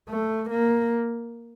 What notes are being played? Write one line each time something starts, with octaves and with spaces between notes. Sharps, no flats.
A3
A#3